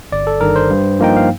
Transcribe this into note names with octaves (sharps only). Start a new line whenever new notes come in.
G1 D5
A4
G2 D#3 A#4
C5
G2
F3 A#3 D#4 G5
F5